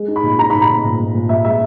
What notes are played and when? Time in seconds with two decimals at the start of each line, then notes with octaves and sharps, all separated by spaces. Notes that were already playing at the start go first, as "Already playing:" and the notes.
Already playing: G#3
0.08 D#4
0.16 B5
0.23 A#2
0.38 D#4 A#5
0.50 A#2 B5
0.61 A#5
0.68 A#2
0.84 A#2
0.99 A#2
1.14 A#2
1.29 A#2 E5
1.44 G#3 E5